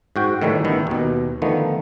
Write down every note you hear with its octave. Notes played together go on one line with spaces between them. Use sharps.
G#2 F#4 G5
A2 D#3 E3 G3 A3
A1 D#3 B3 E4
D#2 B2
D3 D#3 F3 A3 B3